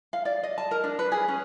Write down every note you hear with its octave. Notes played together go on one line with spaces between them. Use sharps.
F5
D5
D#5
A5
A#4
D4
B4
G#4
C#4